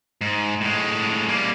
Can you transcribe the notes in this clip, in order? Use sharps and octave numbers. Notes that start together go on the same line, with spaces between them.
G#2
A2 G#3
G3 A#3